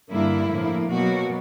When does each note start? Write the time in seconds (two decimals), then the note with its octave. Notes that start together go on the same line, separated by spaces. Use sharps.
0.11 G2 D3 G3 A#3 E4
0.51 A2 F3 A#3
0.91 B2 F#3 A#3 F#4